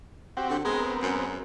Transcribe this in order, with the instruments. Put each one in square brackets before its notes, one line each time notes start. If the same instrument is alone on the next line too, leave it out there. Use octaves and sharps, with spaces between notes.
[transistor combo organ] C4 F#4 G4
[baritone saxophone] D3
[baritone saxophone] G#3 [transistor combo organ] B3 C4 A#4
[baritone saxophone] F#2